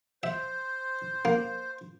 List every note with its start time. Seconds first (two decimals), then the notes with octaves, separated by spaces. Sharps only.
0.23 C5 E5
1.25 A#3